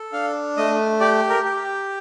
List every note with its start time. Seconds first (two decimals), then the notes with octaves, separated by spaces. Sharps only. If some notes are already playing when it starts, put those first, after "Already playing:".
Already playing: A4
0.13 D4 F5
0.57 A3 D#5
1.00 G4 D5
1.29 A#4
1.44 G4